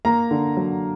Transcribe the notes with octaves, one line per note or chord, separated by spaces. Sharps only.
A#3 A#5
D3
F#3